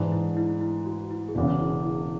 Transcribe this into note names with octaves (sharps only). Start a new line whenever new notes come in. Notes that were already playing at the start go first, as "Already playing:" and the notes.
Already playing: G#2 E3 G#3 D4
E4
E4
E4
F#4
E4
G#4
E1 E2 C#3 F#4
E4
E4